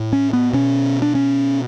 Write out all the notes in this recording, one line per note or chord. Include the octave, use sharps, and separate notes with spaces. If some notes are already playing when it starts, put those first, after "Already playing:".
Already playing: A2
C#4
B3
B2 C#4
D4
C#4